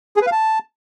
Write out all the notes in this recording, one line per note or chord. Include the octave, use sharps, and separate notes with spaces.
G#4
B4
F5
A5